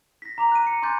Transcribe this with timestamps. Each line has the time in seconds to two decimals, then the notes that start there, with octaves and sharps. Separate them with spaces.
0.22 A#6 B6
0.38 A#5 D6 F7
0.52 F#6 D#7
0.67 C#7
0.82 G#5 C6 D6 F#6 G6 A6